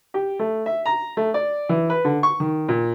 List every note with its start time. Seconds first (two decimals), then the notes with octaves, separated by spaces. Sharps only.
0.14 G4
0.39 A3
0.66 E5
0.86 A#5
1.17 A3
1.34 D5
1.69 E3
1.90 B4
2.05 D3
2.23 C#6
2.40 D#3
2.68 A#2